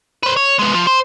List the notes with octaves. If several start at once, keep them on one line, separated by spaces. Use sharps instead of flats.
B4 C5
C#5
G#3 B3
F3
C5